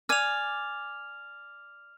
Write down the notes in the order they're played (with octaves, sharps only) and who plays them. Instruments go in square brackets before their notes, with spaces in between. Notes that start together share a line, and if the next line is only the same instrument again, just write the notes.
[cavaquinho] D5 G#5 [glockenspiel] F6 F7